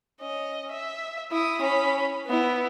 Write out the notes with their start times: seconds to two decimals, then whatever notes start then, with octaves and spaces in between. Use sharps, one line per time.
0.20 C#4 D#5
0.71 E5
1.32 E4 D#6
1.61 C#4 B5
2.27 B3 E4